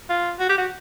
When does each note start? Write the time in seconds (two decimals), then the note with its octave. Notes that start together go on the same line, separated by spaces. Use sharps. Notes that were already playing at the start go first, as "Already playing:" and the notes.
0.10 F4
0.40 F#4
0.49 G4
0.58 F#4